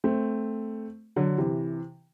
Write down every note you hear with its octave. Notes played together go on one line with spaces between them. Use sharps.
A3 C4
D3 F#3
C3 E3